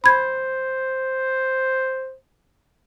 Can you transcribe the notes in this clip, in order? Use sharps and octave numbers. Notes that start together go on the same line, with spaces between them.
C5 B5 G#6